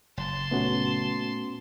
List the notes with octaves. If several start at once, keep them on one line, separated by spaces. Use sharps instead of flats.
F#1 A5 C6
A#2 A3 B3 C#4 F#4